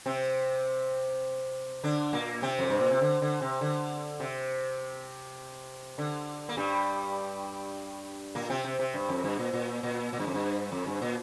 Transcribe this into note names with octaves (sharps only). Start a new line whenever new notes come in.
C3 C4
D3 D4
A#2 A#3
C3 C4
F2
G2
A#2
C3
D3
D3
C3
D3
C3
D3
A#3
G2 G3
A#2 A#3
C3 C4
C3
C3
G2
F2
G2
A#2
A#2
A#2
A#2
G2
F2
G2
F2
G2
A#2